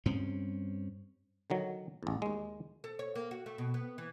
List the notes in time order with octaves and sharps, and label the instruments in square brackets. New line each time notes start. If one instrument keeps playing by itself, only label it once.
[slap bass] G2 C4 C#4
[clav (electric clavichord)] D3 D#3 F#3
A1 E2
D#2 G#3
[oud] A4
C#5
A#3
F#4
A3
B2
B3
E3